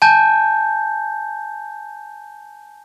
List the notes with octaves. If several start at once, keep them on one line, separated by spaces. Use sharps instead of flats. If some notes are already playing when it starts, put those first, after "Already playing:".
G#5 A5 G6